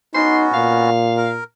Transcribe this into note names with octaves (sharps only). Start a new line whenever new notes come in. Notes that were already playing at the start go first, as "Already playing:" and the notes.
B3 C#4 D#4 F#4 C6
A#2 F5
A#4